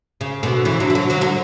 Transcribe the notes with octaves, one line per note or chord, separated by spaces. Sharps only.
C#3
B2 D3
C#3 E3
D3 F#3
E3
D3 F#3
D3 F#3
D3 F#3